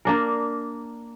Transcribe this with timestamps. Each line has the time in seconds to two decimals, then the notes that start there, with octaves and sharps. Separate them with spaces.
0.05 A#3 D4 A#4